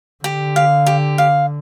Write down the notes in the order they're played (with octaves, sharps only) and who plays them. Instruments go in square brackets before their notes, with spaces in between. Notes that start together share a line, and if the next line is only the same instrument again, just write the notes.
[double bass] D3 [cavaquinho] G4
[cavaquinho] F5
G4
F5